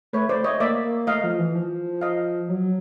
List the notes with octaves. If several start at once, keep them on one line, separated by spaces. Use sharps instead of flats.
A3 B4 C#5
C5 D5
A3 C#5 D#5
A#3 D5 E5
A#3
A3 D#5 F5
F3
E3
F3
D#5 F5
F#3